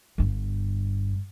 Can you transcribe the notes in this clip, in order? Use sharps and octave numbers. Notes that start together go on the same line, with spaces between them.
G1 G2